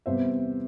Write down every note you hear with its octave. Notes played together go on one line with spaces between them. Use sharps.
E2 C3 G3 B3 C5 E5